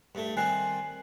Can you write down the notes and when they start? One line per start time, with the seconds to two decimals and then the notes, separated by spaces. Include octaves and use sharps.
0.15 G2 A3
0.37 D#3 G3 C4 G#5 F#6 C7